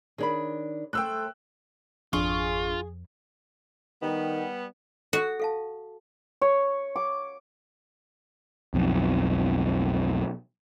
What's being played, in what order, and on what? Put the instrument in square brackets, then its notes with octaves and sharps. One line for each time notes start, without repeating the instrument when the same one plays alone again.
[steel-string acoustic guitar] D#3 D4 [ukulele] G#4 C#5 B5
[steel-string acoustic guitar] A3 A4 C5 [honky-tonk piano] G5 E6 F#6
[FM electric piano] G#1 D4 C#6 [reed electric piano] F2 [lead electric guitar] F4 [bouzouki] G#4
[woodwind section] D#3 [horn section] G3 B3
[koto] F#4 [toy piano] A4
[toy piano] A4 F5 A5
[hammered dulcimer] C#5
D6
[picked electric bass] B1 F2